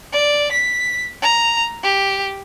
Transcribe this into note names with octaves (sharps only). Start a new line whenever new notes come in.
D5
B6
A#5
G4